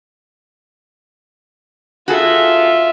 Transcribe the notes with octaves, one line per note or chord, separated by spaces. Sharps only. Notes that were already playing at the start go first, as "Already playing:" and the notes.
F4 F#4 G#4 A4 E5